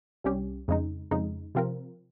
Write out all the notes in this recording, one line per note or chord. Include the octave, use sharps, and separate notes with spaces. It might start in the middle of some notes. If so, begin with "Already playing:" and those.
C2 C3 G3 C#4 G4
F2 C#3 G#3 D#4
F2 C#3 G#3 D#4
C3 F3 C4 F4 A#4